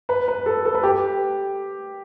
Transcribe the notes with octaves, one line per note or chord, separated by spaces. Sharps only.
B4
B4
A4
A4
B4
G4